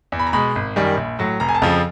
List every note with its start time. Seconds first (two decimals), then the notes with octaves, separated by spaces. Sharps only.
0.12 E2
0.19 B5
0.26 A#5
0.33 B2 G#3 B5
0.56 G#1
0.76 F#2 D#3 G3
0.97 A#1
1.19 A2 F#3
1.40 F1 A#5
1.49 G#5
1.55 A5
1.62 F2 C#3 F3